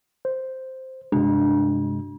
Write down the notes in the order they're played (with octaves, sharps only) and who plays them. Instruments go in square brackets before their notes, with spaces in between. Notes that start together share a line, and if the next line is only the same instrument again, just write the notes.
[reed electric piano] C5
[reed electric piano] G2 C3 G#3 [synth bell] D4